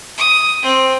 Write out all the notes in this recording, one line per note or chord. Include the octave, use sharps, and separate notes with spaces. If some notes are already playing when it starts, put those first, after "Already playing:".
D#6
C4